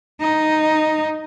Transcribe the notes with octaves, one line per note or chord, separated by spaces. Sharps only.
D#4